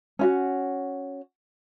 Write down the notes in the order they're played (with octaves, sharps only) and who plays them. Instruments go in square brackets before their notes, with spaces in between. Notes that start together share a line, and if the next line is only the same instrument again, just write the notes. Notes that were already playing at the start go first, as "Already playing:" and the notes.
[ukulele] C#4 F4 F#4